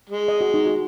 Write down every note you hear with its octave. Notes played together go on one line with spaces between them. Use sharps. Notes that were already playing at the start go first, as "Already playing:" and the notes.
G#3
D#5
F#4
D#4
F#4